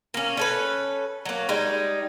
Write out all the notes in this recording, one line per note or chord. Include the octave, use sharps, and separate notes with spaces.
A#3 C#4
C#4 A4 B4
F#3 A#3
G3 G#3 D#4